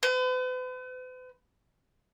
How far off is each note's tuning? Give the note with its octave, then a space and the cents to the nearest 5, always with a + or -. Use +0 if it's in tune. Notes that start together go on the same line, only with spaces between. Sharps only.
B4 +45